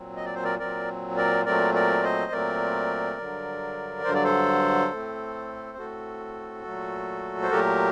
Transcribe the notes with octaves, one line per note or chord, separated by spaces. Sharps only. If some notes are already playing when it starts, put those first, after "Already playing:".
Already playing: A#2 F#3 C4
D#5
D5
C5
A#4 D5
A#2 F#3 C4 A#4 D5
A#4 D5
A#2 F#3 A3 C4 A#4 D5
A#4 D5
C5 D#5
A#2 F#3 A3 C4 A#4 D5
G2 D3 F#3
G2 D3 F#3 C5
D5
A4 C5
A2 A3 C4
A2 A3 C4 F#4 A4
A#2 F#3 A3
C5
A#2 F#3 A3 G4 A#4